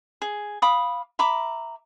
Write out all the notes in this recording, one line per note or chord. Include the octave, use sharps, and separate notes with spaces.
G#4
F5 B5 D6 D#6
E5 A#5 B5 D6